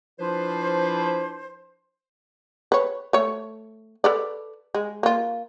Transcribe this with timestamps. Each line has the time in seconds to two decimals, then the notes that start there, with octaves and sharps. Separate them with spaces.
0.20 F3 D4 E4 F4 B4 C5
2.72 B4 C#5
3.13 A3 C#5
4.04 A4 B4 D5
4.75 G#3
5.03 A#3 F4